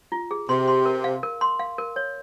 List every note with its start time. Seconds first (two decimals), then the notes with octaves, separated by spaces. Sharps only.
0.12 F4
0.31 G#4
0.49 C3 C6
0.68 C6
0.86 A#4
1.04 F5
1.23 A#4
1.41 C6
1.59 F5
1.78 A#4
1.96 C#5